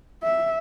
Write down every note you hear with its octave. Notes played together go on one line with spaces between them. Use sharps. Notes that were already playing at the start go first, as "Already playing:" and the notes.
E5